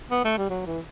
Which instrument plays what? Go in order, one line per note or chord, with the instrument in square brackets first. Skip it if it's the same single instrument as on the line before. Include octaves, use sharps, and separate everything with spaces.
[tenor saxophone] B3
A3
G3
F#3
E3